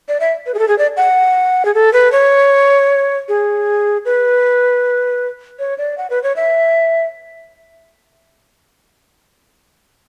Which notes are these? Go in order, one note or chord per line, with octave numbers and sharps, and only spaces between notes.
D5
E5
B4
G#4
A4
G#4
D5
F#5
G#4
A4
B4
C#5
G#4
B4
C#5
D5
F#5
B4
C#5
E5